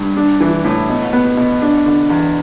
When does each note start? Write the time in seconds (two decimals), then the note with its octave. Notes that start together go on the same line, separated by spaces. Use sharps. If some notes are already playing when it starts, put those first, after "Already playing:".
Already playing: G2
0.17 D4
0.40 E3
0.64 A2
0.89 B2
1.13 B3
1.37 B2
1.62 D4
1.86 D3
2.10 E2